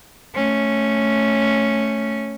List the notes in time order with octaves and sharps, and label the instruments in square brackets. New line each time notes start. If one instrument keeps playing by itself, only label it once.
[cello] A3 C#4